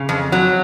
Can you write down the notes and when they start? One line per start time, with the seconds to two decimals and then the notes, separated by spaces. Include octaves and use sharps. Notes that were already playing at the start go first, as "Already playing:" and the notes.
Already playing: C#3
0.09 F2
0.32 F#3